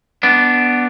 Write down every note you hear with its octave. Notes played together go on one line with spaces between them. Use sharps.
B3 D4